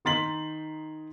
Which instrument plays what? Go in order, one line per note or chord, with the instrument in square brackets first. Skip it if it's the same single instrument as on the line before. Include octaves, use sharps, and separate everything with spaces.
[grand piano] D#3 D#4 C6 A6 B6 F#7